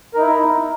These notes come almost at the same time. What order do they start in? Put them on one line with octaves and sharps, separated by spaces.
A#4 D#4 E4